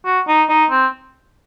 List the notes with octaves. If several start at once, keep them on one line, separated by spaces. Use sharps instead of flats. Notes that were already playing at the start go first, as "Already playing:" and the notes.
F#4
D#4
D#4
C4